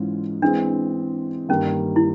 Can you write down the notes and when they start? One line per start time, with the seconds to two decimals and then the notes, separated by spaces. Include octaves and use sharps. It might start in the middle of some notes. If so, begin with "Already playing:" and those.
Already playing: G#2 E3 G#3 C#4 F4
0.42 E3 G#3 C4 D4
1.49 G2 D#3 G3 A#3 C#4
1.96 E4